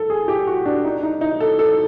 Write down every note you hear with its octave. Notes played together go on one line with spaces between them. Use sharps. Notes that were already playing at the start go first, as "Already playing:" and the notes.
Already playing: A4
G#4
G4
F#4
D4
D#4
D#4
D#4
A4
A4